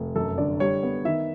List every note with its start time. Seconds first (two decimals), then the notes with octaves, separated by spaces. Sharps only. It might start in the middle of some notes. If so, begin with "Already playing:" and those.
Already playing: F1
0.16 F#2 A4
0.38 D3 D5
0.60 G3 C#5
0.83 B3
1.05 D#3 E5